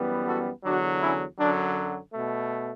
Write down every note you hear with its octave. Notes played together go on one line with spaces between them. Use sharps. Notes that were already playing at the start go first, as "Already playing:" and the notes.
Already playing: F#2 E3 G3 B3
F#4 A4
E2 D3 F#3 D4 F#4
C#4 E4
F#2 D3 F#3 D4
B2 A3